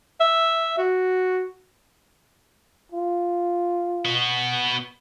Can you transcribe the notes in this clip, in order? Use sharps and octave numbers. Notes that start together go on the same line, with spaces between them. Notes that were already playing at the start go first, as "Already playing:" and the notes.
E5
F#4
F4
B3 F#4